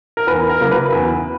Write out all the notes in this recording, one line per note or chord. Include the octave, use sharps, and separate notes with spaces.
A#4
E2 B4
A#4
C#3 F#3 A#3
B4
E2